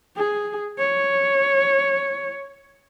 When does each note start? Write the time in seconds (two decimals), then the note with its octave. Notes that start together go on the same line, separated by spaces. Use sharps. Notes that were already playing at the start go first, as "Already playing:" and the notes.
0.17 G#4
0.78 C#5